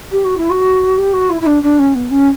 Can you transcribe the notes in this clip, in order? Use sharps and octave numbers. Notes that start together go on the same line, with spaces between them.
G4
F#4
E4
F#4
G4
F#4
E4
E4
D4
D4
C#4
B3
C#4